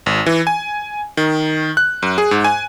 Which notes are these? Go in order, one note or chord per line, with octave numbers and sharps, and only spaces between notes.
G#1
E3
G#5
D#3
F#6
F#2
G#4
G#2
G#5